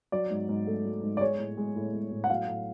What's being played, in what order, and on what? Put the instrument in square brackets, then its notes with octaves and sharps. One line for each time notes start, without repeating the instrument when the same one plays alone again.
[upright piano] F#3 D5
G#2
G#2
A3
F#3
G#2
D5
G#3 C#5
A2
G#3
A2
G#3
A2
F#5
F#3 F5
A2